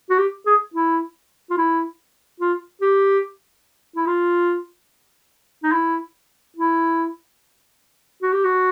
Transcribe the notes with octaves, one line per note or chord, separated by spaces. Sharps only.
F#4
G4
G#4
E4
F4
E4
F4
G4
E4
F4
D#4
E4
E4
F#4
G4
F#4